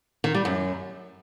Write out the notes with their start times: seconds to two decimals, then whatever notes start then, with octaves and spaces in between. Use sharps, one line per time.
0.24 D#3
0.34 G3
0.45 F#2